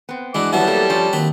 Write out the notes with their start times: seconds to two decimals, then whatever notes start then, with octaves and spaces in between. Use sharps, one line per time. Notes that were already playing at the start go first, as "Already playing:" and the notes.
0.09 B3 C4
0.35 E3 G#3 D4 F#4 D6
0.53 F#3 G3 B3 E4 A5
0.67 A3 A#3 A4
0.90 F3 C#4
1.13 D#2 F#3 C4 B5